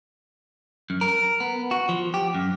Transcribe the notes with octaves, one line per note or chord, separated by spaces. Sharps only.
F#2
A#4
B3
F#4
F3
G4
F#2